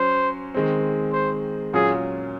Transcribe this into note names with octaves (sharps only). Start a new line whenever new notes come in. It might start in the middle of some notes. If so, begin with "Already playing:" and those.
Already playing: F#3 C#4 C5
D#3 G#3 C4
C5
A#2 F#3 C#4 F4 G#4